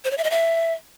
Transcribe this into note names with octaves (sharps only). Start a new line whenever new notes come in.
C5
C#5
E5
D#5
E5